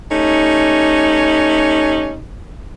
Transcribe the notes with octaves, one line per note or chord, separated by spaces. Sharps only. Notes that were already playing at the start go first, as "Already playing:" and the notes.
A3 C#4 D#4 G4